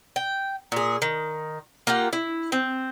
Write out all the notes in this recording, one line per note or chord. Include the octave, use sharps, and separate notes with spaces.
G5
A#2 G#4
D#3
A#3 F4 G4 F#5
E4
C4